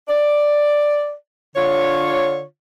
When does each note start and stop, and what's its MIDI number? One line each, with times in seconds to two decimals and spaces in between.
0.08 1.12 74
1.56 2.42 50
1.56 2.42 62
1.56 2.42 65
1.56 2.42 73